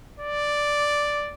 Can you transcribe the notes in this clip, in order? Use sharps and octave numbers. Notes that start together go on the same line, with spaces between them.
D5